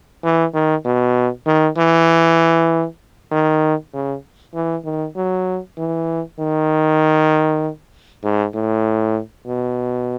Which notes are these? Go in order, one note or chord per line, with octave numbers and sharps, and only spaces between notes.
E3
D#3
B2
D#3
E3
D#3
C#3
E3
D#3
F#3
E3
D#3
G#2
A2
B2